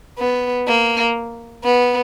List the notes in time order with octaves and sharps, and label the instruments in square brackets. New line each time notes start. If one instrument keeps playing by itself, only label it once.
[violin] B3
A#3
B3